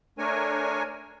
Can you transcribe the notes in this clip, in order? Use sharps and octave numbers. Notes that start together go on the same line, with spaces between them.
A3 D4 A#4 C#5 G#5